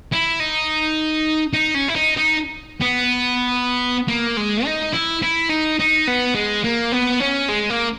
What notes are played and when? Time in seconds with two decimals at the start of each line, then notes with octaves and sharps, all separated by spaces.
0.12 E4
0.40 D#4
1.53 D#4
1.75 C#4
1.88 E4
1.95 D#4
2.17 D#4
2.81 B3
4.08 A#3
4.37 G#3
4.65 D#4
4.93 E4
5.22 E4
5.50 D#4
5.79 D#4
6.07 B3
6.35 G#3
6.64 A#3
6.92 B3
7.20 C#4
7.49 G#3
7.70 A#3